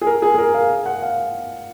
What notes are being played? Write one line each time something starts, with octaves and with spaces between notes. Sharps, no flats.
G#4
A#4
G#4
G#4
A#4
F5
F#5
F5